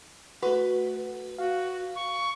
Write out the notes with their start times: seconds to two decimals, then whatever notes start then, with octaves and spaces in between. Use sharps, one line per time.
0.42 A3 F#4 B4
1.38 F#4 F5
1.96 C#6